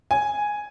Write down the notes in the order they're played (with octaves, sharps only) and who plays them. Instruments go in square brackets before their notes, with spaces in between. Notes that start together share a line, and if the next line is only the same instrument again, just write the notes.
[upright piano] G#5